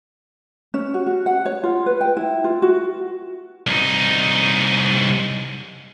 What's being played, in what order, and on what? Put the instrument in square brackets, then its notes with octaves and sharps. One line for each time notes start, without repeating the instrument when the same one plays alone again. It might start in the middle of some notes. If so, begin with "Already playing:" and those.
[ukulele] C#4
F#4
F#4
F#5
C#5
F4
B4
G5
E4
F4
F#4
[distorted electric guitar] C2 D#4